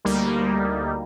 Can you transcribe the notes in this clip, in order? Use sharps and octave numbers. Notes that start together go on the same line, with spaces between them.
D2 G3 A#3 D#4